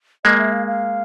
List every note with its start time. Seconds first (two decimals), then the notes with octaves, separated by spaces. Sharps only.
0.25 G#3 A#3 D#5
0.38 E5
0.52 F5
0.67 F5